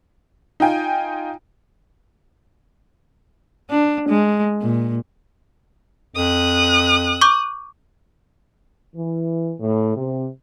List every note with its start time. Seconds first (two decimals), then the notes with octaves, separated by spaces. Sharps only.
0.60 D#4 F4 G5 G#5
3.70 D4
4.09 G#3
4.61 A#2
6.16 F2 D#6 F#6
7.21 C#6 D6 G6
8.95 E3
9.60 A2
9.96 C3